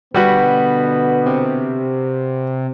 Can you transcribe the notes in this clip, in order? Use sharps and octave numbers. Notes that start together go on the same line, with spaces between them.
B2 D3 G3 B3 F#4 B4
C3